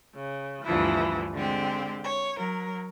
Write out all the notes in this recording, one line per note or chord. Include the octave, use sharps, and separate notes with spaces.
C#3
D2 G2 E3 F3 E4
D3 G#3 C4 G4
C#5
F#3 A#4